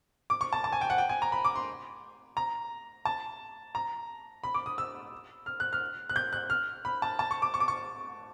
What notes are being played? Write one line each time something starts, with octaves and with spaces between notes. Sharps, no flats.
D6
C#6
A5
A5
G#5
G5
F#5
G5
G#5
A#5
B5
D6
C6
A#5
A5
A#5
B5
D6
D#6
E6
F6
F#6
F6
F#6
G6
F#6
F6
B5
A5
A5
C#6
D6
C#6
D6
C#6